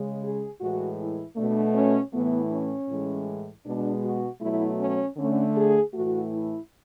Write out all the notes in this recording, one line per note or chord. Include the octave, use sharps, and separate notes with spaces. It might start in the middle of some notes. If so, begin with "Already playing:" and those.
Already playing: C#3 G#3
G#4
A2 E3 G#3 F#4
E4
B2 A3 D4
C#4
A2 E3 A3 B3
C#4
A2 E3 G#3
B2 G#3 D4
F#4
B2 F#3 A3 E4
C#4
D3 A3 C#4
G#4
A2 E3 A3 F#4
E4